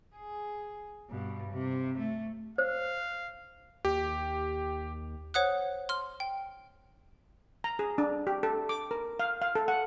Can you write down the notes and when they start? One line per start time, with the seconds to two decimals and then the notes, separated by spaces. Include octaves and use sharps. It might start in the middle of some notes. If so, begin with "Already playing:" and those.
0.16 G#4
1.10 G2 B2
1.52 C3
1.98 A3
2.58 C5 F5
3.85 D#2 G4
5.34 C5 C#5 F#5 D#6 F#6
5.89 C6 F6
6.20 G5
7.64 A#5
7.79 G#4
7.98 D4
8.27 G4
8.43 A4
8.69 D6
8.91 A#4
9.20 F5
9.42 F5
9.55 A4
9.68 F#5